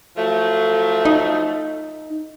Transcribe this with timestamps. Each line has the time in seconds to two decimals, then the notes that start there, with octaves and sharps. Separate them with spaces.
0.17 F3 F#3 A3
1.05 D#4